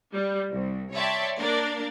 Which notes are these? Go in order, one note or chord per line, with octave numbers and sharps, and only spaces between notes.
G3
C2
C#5 D5 E5 G5 A5 C6
A#3 D4 A#4 D5